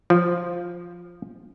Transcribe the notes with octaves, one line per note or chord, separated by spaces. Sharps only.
F3